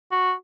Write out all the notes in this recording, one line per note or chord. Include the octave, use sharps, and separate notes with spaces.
F#4